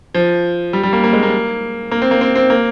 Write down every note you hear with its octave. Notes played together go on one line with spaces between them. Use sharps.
F3
G3
G3
A#3
A#3
G#3
A#3
A#3
C4
A#3
C4
C4
A#3